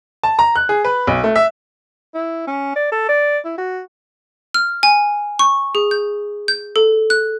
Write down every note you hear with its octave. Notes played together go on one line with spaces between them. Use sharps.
A5
A#5
F#6
G#4
B4
B1
A3
E5
E4
C#4
D5
A4
D5
E4
F#4
F6
G#5
C#6
G#4
G6
G6
A4
F#6